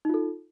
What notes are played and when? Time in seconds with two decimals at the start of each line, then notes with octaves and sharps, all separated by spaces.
0.05 D#4
0.09 F4
0.14 A4